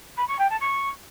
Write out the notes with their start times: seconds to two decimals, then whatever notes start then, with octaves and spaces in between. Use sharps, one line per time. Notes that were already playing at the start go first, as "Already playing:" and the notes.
0.17 B5
0.28 C#6
0.39 G5
0.49 A5
0.60 C#6